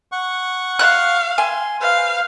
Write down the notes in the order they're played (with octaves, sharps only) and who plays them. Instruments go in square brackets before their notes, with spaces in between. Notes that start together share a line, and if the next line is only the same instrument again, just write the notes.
[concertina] F#5 C#6
[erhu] F5 [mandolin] F#6
[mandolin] G#5 [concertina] C6
[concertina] B4 C5 [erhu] F5